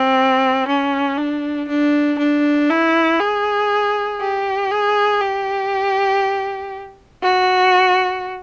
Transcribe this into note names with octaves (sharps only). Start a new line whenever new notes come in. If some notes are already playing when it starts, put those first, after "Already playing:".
Already playing: C4
C#4
D4
D4
D4
E4
G#4
G4
G#4
G4
F#4